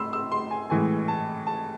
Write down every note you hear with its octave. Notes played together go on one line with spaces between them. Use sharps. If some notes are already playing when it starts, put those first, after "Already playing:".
Already playing: A2 B5 C6 E6
E6
C6
G#5
A2 E3 G#3 G#5
A5
A5